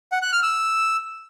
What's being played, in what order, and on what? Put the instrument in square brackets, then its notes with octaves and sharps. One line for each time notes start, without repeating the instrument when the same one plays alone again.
[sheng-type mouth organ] F#5
F#6
F6
E6